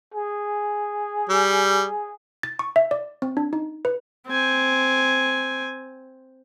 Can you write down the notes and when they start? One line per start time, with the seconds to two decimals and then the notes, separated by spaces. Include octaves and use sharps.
0.14 G#4
1.29 G3
2.43 A6
2.59 C#6
2.76 E5
2.91 D5
3.22 C4
3.37 D4
3.53 D#4
3.85 B4
4.27 C4 G#5